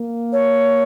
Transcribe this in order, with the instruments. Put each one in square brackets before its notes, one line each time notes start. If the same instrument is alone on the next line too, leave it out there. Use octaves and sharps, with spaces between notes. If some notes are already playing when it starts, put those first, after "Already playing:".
Already playing: [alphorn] A#3
[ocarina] C#5